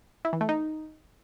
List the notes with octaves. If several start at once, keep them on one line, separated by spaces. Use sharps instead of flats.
E4
E3
A3
D#4